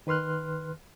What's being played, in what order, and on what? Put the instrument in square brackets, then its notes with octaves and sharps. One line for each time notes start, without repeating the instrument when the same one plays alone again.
[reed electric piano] D#3 B4 C6 F6 F#6